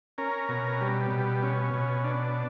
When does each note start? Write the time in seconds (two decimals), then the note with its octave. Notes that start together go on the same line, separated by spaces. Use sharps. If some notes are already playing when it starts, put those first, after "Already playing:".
0.18 C#4 A#4
0.49 B2
0.81 G3
1.11 B2
1.43 C#4
1.74 B2
2.04 D4